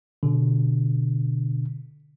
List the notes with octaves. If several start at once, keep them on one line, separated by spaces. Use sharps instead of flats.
B2 D3